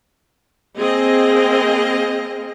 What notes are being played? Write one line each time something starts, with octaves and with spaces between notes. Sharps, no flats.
A#3 C4 G#4 D#5